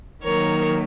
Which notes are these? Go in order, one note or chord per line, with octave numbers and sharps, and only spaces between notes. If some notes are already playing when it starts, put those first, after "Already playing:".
D#3 F#3 A#3 A#4 C#5